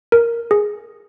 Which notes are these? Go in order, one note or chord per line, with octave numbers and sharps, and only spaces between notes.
A#4
G#4